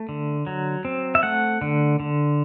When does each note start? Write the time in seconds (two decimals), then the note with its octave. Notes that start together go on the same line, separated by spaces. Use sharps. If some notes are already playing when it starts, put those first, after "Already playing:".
Already playing: A3
0.09 D3
0.47 F#3
0.85 C4
1.15 E5
1.23 A3 F#5
1.61 D3
2.00 D3